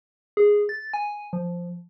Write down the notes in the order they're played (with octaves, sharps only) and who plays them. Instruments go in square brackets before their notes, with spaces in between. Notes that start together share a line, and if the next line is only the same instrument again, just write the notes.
[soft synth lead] G#4
A6
G#5
F3